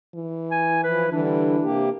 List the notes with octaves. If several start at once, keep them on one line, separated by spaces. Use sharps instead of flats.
E3
G#5
F3 E4 B4
D3 E3 G3 D4
C3 A#3 G4